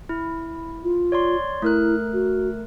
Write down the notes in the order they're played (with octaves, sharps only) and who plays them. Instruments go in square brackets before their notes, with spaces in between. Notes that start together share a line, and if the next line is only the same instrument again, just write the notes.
[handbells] E4
[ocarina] F4
[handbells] C#5 D5 C6
[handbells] A3 A#4 F#6 [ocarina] E4
[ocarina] F#4